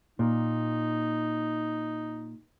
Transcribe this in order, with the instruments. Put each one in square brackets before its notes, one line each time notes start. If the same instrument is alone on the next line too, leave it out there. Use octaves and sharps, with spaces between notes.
[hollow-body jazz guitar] A#2 [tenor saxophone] D#4